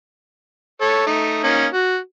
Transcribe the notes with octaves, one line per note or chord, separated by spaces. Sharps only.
A4 C#5
A3 D#4
A#3 C#4 D#4
F#4